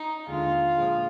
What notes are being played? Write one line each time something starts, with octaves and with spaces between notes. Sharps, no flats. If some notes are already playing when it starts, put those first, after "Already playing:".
Already playing: D#4
D#2 D3 G#3 F4
A#2 F3 G#3